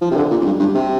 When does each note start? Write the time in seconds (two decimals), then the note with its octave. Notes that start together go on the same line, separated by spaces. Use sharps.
0.01 F3
0.11 C3
0.17 D3
0.31 A#2
0.41 F2
0.45 G2
0.60 G2
0.74 C3